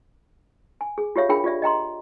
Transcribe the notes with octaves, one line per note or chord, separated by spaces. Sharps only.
G#5
G#4
F4 G4 C#5 E5 F5
D4 F4 G#4 A#4 G5 B5
F4 G4 D5 E5
D#5 G5 A#5 C6